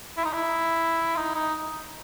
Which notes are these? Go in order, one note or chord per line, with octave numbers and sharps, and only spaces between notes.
E4
D#4
E4
D#4
D#4